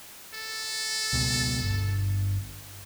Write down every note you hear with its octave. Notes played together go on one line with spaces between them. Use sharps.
A4
C#2 B2
G1